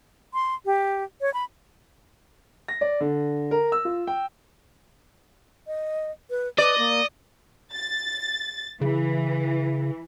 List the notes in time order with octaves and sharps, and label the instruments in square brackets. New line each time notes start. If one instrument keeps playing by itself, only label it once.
[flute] C6
G4
C#5
B5
[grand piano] A#6
D5
D3
A#4
E6
F4
G5
[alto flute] D#5
B4
[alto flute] B4 [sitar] D5 [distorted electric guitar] D#5
[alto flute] A#3
[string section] A6
[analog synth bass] C#3 [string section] E3